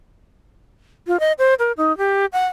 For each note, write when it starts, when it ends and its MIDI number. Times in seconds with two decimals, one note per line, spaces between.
1.07 1.19 65
1.20 1.32 75
1.39 1.54 72
1.59 1.72 70
1.77 1.96 63
1.98 2.26 67
2.33 2.46 78